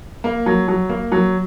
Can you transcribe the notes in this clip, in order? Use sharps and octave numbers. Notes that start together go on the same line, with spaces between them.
A#3
F#3
F#3
A#3
F#3